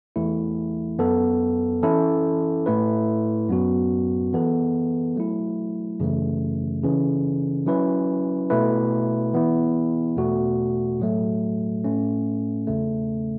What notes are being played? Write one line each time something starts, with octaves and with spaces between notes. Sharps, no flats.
E2 E3 A3 E4
F#2 F#3 B3 A4
E3 C#4 E4 A4
A2 A3 E4 B4
F#2 F#3 B3 F#4
E3 B3 A4
F#3 A3 E4
F#2 C#3 E3 A3
C#3 E3 C#4
F#3 C#4 E4 B4
B2 A3 E4 B4
E3 B3 E4
E2 B2 A3 F#4
A2 F#3 A3
A2 A3 C#4
E2 C#3 A3